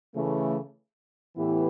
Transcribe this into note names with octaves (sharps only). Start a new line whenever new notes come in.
C#3 E3 A3
A2 E3 B3 E4 G4